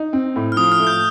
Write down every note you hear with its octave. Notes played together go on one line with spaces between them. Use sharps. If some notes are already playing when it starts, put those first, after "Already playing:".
Already playing: D#4
C4
A2
F6
F3 D#6
F6
A3
G6